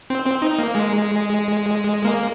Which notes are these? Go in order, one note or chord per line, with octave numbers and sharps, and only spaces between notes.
C4
C4
D#4
A#3
G#3
A#3